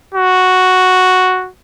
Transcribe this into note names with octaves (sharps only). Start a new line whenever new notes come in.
F#4